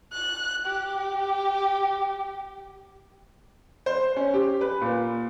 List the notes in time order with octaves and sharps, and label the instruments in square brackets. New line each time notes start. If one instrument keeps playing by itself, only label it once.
[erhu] F#6
G4
[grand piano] C5
C#4
G4
B4
A#2